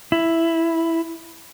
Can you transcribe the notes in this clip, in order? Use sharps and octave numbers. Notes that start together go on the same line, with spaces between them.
E4